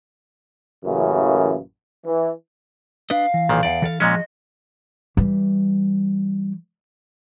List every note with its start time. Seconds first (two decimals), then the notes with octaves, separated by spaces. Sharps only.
0.85 A1 F#2 C#3 E3 A#3
2.06 E3
3.10 D4 B4 D#5 F5
3.34 E3
3.49 B1 A#2 D#3
3.63 E2 D5
3.82 E3 A4 F5
4.00 A#2 F3 G#3 C#4 G#4 D#5
5.17 E3 G3